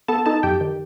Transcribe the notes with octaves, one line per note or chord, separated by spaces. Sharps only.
B3 A4 A5
D#4 A4 A5
F#2 G4 G5
D#3